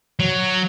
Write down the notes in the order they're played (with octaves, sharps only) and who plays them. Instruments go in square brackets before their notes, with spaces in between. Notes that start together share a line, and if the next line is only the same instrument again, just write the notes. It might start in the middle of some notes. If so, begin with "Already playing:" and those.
[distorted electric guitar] F#3